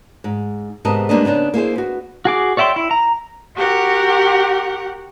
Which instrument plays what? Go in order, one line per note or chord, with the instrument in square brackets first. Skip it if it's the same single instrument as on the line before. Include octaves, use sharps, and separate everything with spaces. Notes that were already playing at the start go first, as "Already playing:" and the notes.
[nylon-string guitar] G#2
G#2 C3 B3 A#4 D#5 A5
G3 G#3 A#3 B3 D4 D#5
C#3 B3 D4 D#4
A#3 E4 G#4 C5
B3 F#4
[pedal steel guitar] F#4 G#4 D6
C#5 D5 E5 G5 C6
E4
A#5
[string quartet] F#4 G4 A#4 F#5